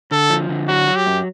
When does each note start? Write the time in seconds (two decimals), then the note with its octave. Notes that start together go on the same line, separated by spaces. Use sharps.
0.11 D3 A4
0.30 F3
0.49 D3
0.68 F#3 F#4
0.87 F#3
0.96 G4
1.07 F#2